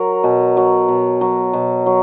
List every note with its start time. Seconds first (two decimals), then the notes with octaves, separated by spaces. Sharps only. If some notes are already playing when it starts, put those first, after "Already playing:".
Already playing: F#3 A#4
0.24 B2
0.57 F#3
0.89 B2
1.21 F#3
1.53 B2
1.86 F#3